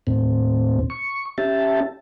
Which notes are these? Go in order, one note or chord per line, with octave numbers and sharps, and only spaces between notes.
D#2 A2 C4
C#6
C#4 G4 E5 A5